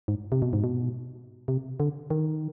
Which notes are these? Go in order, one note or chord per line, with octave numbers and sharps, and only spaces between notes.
G#2
C3
B2
G#2
B2
C3
D3
D#3